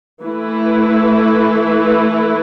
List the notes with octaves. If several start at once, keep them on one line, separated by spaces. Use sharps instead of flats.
E3 A3 E4 B4